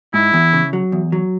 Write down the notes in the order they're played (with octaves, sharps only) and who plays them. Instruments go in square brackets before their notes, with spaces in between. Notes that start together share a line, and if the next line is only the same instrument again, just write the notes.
[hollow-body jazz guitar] G#2 [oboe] E4
[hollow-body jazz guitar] E2
C#3
F#3
E2
F#3